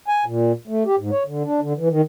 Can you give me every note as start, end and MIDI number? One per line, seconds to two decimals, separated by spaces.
0.08 0.24 80
0.25 0.52 46
0.67 0.83 57
0.86 0.96 67
0.99 1.11 44
1.11 1.23 73
1.26 1.43 50
1.44 1.60 62
1.61 1.73 50
1.78 1.89 52
1.90 2.01 51